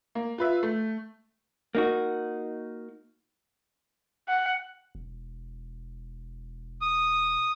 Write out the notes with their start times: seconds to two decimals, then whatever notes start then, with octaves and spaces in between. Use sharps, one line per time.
0.15 A#3
0.38 F4 B4 E5
0.63 A3
1.75 A#3 D#4 F#4
4.28 F#5
4.95 E1
6.81 D#6